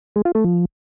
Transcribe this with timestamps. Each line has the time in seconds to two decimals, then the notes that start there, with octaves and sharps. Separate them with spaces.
0.16 G#3
0.25 F4
0.35 A3
0.44 F3